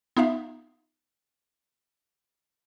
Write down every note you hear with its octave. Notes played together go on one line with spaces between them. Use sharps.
B3 D#4 F4 E5 F5